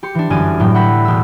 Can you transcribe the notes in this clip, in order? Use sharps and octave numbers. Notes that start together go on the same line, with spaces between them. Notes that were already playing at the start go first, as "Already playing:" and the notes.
G4 C6 C#7
E3 D4
G1 F#2 E3 D5 G#5 D#7
A2 F#3 G5
F#5 G5 B5 E6 B6
E1 E6